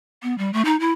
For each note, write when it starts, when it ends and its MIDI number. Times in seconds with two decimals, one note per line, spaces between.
0.23 0.36 59
0.38 0.51 55
0.53 0.62 57
0.65 0.79 63
0.80 0.92 64